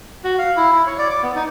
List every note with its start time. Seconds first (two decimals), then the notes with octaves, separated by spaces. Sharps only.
0.24 F#4
0.38 F5
0.56 E4
0.72 E4
0.87 C#5
0.98 D5
1.11 D6
1.23 B3
1.36 D#4